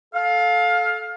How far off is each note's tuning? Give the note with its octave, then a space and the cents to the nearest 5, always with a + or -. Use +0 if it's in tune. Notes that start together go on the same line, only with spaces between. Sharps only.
A4 -15 F5 +20